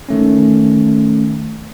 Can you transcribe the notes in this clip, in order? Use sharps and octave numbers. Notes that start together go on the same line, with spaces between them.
D#3 A3 C#4